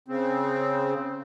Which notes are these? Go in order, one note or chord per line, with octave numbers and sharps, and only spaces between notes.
C#3 C4